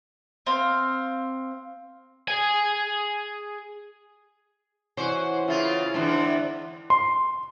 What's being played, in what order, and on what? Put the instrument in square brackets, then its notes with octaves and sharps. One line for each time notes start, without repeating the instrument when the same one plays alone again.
[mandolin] C4 F5
[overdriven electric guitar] G#4 G#5
[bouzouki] E3 C#4 F#4 [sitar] C5
[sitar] C#3 F4 [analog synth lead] E4
[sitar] G#2 D3 E3 [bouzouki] C4
[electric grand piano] C6